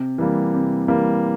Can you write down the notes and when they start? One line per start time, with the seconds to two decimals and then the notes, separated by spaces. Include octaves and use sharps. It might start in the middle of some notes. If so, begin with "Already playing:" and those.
Already playing: C3
0.18 E3 G3 A#3
0.54 C3
0.88 E3 G3 A#3